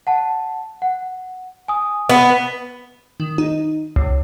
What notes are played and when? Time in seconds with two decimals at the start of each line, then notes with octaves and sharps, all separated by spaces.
0.07 F#5 A5
0.82 F#5
1.68 G#5 D#6
2.09 B3
3.20 D#3
3.38 D#4
3.96 C#2